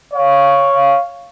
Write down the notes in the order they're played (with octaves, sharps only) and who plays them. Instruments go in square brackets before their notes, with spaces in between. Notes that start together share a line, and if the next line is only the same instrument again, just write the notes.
[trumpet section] C#5 F5